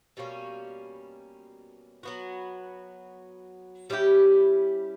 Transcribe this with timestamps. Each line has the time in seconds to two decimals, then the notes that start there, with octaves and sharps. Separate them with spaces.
0.17 B2 G3 A#3 C#4
2.03 F#3 B3 F#4
3.90 G3 C#4 E4 G4